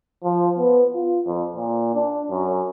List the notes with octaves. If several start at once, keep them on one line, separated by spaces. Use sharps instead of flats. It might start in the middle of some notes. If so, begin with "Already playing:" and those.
F3
B3
F4
F2
A#2
D4
F#2